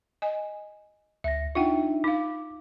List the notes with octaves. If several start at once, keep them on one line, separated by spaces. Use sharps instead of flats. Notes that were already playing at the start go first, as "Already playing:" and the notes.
D#5 G#5
D2 E5 A#6
D4 D#4 F4 E5 F#5 G5
D#4 F5 D6